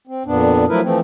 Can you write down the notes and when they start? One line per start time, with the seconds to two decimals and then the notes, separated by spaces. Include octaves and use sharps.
0.07 C4
0.26 F2 A#2 B3 D4
0.69 F3 F#3 A3 E4 A#4 B4
0.82 E3 F3 A3 C4